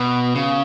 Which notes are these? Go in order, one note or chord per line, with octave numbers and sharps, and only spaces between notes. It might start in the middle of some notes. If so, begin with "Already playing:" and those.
Already playing: B2
C#3